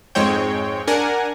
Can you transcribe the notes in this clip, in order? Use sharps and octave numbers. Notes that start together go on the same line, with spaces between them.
F2 G#2 G#3 C4 C#5 G5
D4 A#4 F#5 G#5